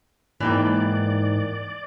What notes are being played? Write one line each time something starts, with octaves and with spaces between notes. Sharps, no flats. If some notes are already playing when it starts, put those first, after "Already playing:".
G#2 E3 A#3 D5 G5